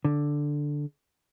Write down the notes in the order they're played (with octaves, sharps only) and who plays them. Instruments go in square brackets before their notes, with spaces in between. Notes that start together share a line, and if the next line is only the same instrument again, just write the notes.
[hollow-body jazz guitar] D3